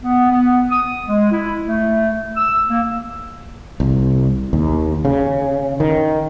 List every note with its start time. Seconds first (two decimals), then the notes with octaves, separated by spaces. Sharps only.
0.02 B3
0.29 B3
0.69 D#6
1.06 G#3
1.30 E4
1.65 A3
2.36 E6
2.70 A#3
3.80 C2
4.53 D#2
5.05 C#3
5.80 D#3